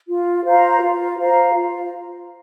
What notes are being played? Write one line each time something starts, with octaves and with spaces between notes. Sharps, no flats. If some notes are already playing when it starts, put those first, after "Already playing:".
F4
C5 F5 A#5
F4
C5 F5 A#5
F4